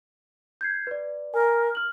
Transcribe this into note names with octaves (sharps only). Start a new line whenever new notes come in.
G6 G#6 C7
B4 D5
A#4 G#5
F6 F#7